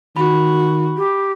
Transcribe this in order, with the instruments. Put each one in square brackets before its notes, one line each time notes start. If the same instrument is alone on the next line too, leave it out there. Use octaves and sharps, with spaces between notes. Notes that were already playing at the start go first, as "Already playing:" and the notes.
[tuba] D#3 [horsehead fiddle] F#4 [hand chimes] B5
[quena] G4